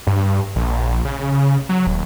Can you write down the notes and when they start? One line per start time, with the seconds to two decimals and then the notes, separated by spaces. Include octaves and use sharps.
0.07 G2
0.56 A#1
1.05 C#3
1.69 F#3
1.87 D#1